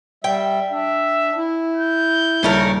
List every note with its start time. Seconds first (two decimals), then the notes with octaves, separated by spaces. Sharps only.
0.24 G3 E5 G5
0.71 D4 E5
1.37 E4
1.77 G6
2.43 D#1 C#3 A3 A#4 A5